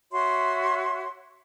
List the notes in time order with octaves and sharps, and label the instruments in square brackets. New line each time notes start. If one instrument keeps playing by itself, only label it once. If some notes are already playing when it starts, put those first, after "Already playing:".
[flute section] F#4 C#5 E5 C6